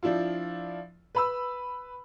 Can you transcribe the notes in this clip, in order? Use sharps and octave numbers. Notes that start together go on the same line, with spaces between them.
F3 D4 E4 F4
B4 B5 E6